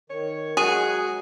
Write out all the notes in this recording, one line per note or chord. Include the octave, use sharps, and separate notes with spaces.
D#3 C#5
F#3 G#3 F#4 G#4